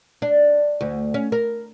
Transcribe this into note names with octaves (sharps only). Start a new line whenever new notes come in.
D4
D2
C#4
A#4